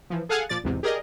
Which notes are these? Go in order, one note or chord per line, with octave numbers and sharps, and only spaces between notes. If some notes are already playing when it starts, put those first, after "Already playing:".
E3 F3
G#4 A4 F5 F#5 G#5
A#2 F3 D5 A6
B1 E2 G#2 C3
G4 G#4 A#4 D5 D#5